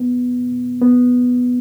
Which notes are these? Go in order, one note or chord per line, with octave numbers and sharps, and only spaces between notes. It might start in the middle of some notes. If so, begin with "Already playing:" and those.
Already playing: B3
B3